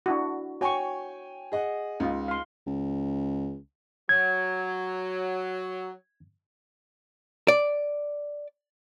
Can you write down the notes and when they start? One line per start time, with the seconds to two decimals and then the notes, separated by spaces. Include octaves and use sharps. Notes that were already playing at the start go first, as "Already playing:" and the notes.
0.06 D4 E4 F#4
0.61 F#4 C#5 G5 G#5 C#6
1.52 G#4 D#5 F#5
2.00 C#2 D#4 F4
2.28 F5 C6
2.67 C#2
4.09 F#3 G#6
7.48 D5